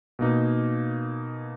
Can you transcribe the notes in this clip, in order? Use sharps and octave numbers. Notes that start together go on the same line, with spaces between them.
B2 A#3 D#4